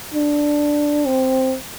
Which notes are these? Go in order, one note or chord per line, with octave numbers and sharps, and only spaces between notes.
D4
C4